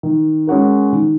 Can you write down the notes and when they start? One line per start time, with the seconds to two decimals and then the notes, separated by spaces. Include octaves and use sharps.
0.03 D#3
0.47 G#3 C#4 F#4 A#4
0.92 D#3